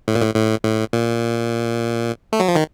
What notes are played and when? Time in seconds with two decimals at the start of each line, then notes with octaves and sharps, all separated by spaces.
0.08 A2
0.15 A#2
0.22 A2
0.35 A2
0.65 A2
0.93 A#2
2.33 A3
2.40 F#3
2.49 F3
2.56 D#3